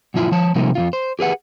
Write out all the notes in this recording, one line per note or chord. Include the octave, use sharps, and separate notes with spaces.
F#2 A#2 F3 E4 F4
F3 C#5 A5
C3 F3 G3 A#3 D#4
F2 B2 F4
C5
G4 G#4 B4 F#5